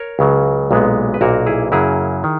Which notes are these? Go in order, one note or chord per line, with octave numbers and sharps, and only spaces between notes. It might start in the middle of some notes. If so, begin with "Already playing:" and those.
Already playing: A#4 C#5
C#2 C#3 F#3
B1 A#2 G#3 B3
B4
B1 A#2 A#3 F#4 A#4
E4 G#4
F#2 C#3 F#3 A#3 E4 G#4
D#3